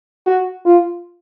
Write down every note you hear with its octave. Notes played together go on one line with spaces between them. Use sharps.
F#4
F4